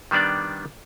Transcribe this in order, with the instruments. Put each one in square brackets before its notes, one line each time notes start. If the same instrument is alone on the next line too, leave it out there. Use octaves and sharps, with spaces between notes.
[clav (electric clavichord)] D#3 G3 B3 D4 D5